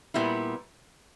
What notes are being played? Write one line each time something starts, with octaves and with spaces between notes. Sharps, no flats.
A#2 G3 B3 E4